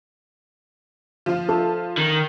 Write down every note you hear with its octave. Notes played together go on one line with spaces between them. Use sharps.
F3 F4
A4
D#3